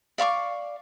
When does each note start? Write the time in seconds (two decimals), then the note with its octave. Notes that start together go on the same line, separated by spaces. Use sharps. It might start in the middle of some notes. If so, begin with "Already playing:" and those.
0.18 D5 F5 C#6 D6